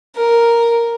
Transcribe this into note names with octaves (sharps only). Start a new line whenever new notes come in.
A#4